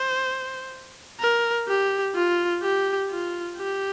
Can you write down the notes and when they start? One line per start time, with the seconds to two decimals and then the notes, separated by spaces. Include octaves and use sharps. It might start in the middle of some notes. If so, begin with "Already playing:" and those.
Already playing: C5
1.20 A#4
1.68 G4
2.15 F4
2.62 G4
3.10 F4
3.57 G4